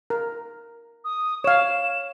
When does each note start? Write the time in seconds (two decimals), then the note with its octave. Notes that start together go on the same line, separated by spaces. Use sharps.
0.10 A#4
1.05 D#6
1.44 C#5 F5 E7